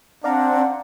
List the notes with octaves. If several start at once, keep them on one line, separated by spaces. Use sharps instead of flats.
C4 D4 D5 F5 F#5 A#5